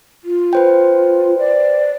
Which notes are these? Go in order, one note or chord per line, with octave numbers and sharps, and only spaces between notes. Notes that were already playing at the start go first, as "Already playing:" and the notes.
F4
B4 C5 G5
D5